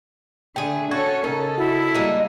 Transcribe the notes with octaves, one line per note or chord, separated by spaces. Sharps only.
D3 A3 G#4 G5
C#4 F#4 A4 C#5 G#6
C#3 D#4 A4 A#4
E4 F#4
G3 G#3 A#3 D#4